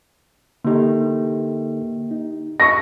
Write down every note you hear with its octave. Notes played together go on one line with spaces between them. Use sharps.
D3 A#3 D#4 G4 A4
D#4
D#5 A5 B5 C#6 A#6